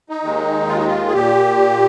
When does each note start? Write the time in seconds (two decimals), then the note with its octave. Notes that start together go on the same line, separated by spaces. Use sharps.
0.09 D#4
0.24 D#2 D#3 G#3
0.68 F4
0.77 D#4
0.87 F4
1.08 G#4
1.13 A#2 G4